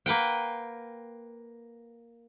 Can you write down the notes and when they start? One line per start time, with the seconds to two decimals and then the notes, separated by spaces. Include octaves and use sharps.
0.06 A#3 B4 F#5 G5